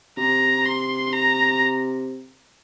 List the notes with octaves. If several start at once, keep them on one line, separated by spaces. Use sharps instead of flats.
C3 A#5
C6
A#5